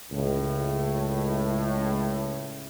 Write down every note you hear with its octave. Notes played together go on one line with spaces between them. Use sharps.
C#2 A2